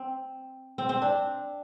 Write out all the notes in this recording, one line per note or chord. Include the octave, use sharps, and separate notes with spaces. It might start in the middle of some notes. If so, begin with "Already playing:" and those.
Already playing: C4
C4
C4
D4